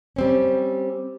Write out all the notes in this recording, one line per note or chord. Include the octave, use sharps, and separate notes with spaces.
G3 C4 C#4